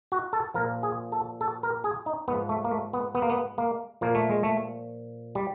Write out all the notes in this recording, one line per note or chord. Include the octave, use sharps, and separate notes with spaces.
F#4
A4
A#2 F3 A#4
G#4
A4
A4
A#4
G#4
D#4
G#2 F3 B3
A3
A#3
A3
B3
B3
A#3
B3
A#3
A#2 F3 A#3
A3
G#3
A3
G3